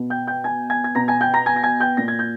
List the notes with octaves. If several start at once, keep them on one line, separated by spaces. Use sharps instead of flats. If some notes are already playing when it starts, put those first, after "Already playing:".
Already playing: B2
G5 G6
G5 G6
G#5 G#6
G#5 G#6
G#6
B2 A#5 A#6
G#5 G#6
G5 G6
A#5 A#6
G#5 G#6
A#6
G#5 G#6
G5 G6
A#2 A#6
G#6
G6